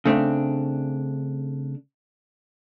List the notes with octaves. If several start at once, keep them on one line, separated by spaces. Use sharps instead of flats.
C#3 A3 C4 D4